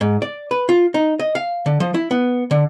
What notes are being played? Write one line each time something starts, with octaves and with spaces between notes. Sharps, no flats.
G#2
D5
B4
F4
D#4
D#5
F5
D3
F3
E4
B3
D3